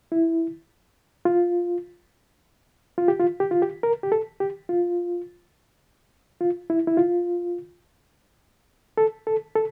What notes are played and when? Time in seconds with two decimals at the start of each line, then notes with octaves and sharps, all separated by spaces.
0.12 E4
1.25 F4
2.98 F4
3.08 G4
3.20 F4
3.40 G4
3.51 F4
3.62 G4
3.83 A#4
4.03 G4
4.12 A4
4.40 G4
4.69 F4
6.41 F4
6.70 E4
6.87 E4
6.97 F4
8.98 A4
9.27 A4
9.56 A4